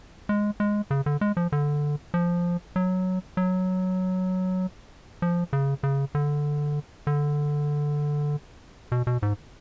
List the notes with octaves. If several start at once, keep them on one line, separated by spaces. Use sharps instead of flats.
G#3
G#3
C#3
D3
G#3
F3
D3
F3
F#3
F#3
F3
C#3
C#3
D3
D3
B2
B2
G#2